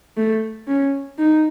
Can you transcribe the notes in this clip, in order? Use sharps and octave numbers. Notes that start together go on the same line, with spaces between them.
A3
C#4
D#4